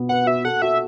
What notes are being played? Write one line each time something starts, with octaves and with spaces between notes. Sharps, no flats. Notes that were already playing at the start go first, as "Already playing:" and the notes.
Already playing: B2 B3 F#4
B4 F#5
F#4 E5
A4 F#5
F#4 E5